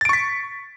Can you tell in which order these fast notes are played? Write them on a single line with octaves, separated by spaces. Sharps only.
A6 D7 C#6 B6